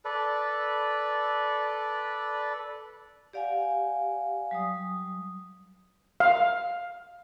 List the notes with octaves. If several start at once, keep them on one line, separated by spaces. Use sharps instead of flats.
A4 B4 D5
G4 D5 F5 F#5 G#5
F#3 G3 D#6
F5